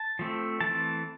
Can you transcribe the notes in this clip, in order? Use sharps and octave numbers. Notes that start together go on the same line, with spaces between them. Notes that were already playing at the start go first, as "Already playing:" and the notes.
Already playing: A5
F3 A3 C4
E3 A3 C4 A5